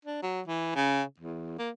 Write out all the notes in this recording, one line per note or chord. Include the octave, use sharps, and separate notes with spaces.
D4
F#3
E3
C#3
E2
A#3